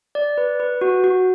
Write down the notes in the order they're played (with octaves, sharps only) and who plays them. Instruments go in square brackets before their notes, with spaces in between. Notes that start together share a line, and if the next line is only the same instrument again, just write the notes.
[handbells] D5
B4
B4
F#4
F#4